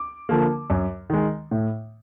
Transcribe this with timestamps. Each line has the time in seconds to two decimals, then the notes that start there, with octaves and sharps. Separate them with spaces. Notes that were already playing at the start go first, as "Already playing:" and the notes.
Already playing: D6
0.29 D3 F3 A#3
0.70 F#2
1.10 D#3 G#3
1.51 A2